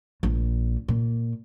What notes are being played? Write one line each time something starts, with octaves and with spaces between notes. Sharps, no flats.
A#1 A#2
A#2